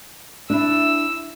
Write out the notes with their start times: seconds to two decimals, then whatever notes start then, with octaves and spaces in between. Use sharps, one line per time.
0.50 D4 E4 E6